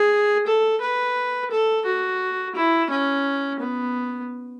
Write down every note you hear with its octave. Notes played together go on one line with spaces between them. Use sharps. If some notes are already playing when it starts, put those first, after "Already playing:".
Already playing: G#4
A4
B4
A4
F#4
E4
C#4
B3